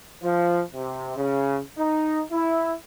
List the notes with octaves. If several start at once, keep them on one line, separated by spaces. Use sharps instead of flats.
F3
C3
C#3
D#4
E4